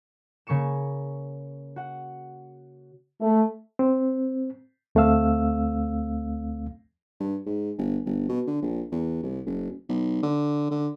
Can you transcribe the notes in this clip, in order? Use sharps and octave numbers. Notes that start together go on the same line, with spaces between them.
C#3 A#3 C#6 C#7 E7
F#4 F#5
A3
C4
D2 A3 C4 F5 E6
G2
G#2
G1
G1
B2
D3
A#1
E2
C2
F#1
B1
D3
D3